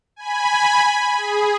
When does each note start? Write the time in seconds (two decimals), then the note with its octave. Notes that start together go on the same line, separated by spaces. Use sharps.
0.16 G#5 B5
1.17 G#4